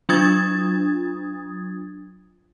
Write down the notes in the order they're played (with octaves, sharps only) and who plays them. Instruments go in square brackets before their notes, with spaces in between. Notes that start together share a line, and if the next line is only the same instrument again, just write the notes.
[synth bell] F#3 D4 F4 D#6 G#6 A6